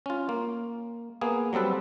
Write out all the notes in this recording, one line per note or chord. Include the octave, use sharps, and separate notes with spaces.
C#4 F4
A#3
A#3 B3 G#4
F#3 G3 C4 A4 B4